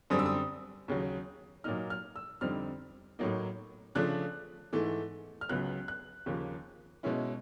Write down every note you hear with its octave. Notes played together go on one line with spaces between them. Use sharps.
F#2 D3 G3 C4 D#6
E6
D#6
D#2 C#3 F#3
A#2 F#3 A#3 D#4 F6
F6
E6
F2 D3 G3 C4 D#4 F6
A2 F#3 A#3 D#4
C#3 F3 A3 D4 F#6
G#2 E3 A3
F6
C#2 C#3 F#3 B3 F#6
F#6
D#2 C#3 F3 A#3
B2 G#3 C#4 E4